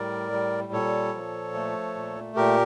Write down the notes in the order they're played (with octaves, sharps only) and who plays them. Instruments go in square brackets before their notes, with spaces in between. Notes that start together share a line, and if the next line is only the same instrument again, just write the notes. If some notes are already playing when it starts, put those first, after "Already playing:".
Already playing: [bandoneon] A2 G3 A#4 D5
G3
A#2 A4 C#5
F3
A3
A#2
A#2 G4 A#4